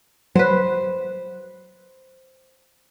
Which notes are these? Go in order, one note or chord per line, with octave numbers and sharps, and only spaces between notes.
F#3 B4 C5